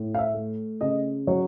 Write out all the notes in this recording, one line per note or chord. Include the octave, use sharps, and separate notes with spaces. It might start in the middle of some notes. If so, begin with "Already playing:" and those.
Already playing: A2
F5
E5
A3
C#3 D#5
F#3 C#5